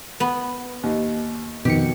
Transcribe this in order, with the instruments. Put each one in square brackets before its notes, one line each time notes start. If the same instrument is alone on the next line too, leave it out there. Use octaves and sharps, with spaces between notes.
[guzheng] B3
[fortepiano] D#2
[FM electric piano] F2 D#3 C#7 [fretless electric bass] B2 [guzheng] G4